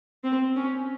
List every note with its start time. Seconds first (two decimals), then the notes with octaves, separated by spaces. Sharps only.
0.24 C4
0.56 C#4